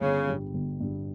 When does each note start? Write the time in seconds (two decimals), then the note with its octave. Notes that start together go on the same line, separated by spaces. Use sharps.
0.01 G1 C#3
0.27 G2 G3
0.54 G1
0.80 G2 G3